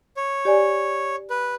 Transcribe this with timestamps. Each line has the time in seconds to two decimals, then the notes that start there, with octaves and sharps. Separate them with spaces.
0.17 C#5
0.45 G4 D5 G#5
1.30 B4